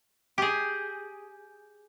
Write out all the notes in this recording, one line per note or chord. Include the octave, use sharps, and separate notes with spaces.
G4 G#4